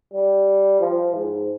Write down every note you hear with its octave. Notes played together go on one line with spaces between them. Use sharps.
G3
F3
G#2